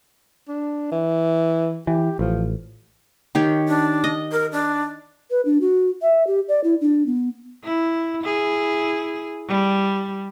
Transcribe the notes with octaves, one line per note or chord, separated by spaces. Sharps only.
D4
E3
E3 G4
A1 F3
D#3 G4 C#5
D4
D#5
A#4
D4
B4
D4
F#4
E5
G4
D5
E4
D4
B3
E4
E4 G#4
G3